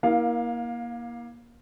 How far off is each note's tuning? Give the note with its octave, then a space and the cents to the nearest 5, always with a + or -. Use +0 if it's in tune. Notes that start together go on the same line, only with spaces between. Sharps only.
A#3 +25 E4 -35 F5 +5